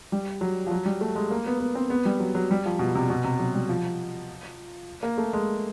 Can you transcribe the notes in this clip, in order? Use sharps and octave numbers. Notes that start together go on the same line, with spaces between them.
G3
F#3
F3
F#3
G3
A3
G#3
A#3
B3
B3
C4
B3
G3
F#3
F#3
G3
F3
B2
C3
B2
C3
F#3
G3
F3
A#3
A3
G#3